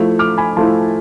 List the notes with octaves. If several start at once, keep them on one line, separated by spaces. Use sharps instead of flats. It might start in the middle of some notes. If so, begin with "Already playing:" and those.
Already playing: F3 A3 E4
D6 F6
G#5 B5
F3 A3 E4 A5 C6